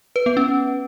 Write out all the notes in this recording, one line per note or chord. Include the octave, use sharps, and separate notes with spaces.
B4
B3
C#4